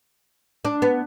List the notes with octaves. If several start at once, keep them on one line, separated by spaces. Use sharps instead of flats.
D4
B3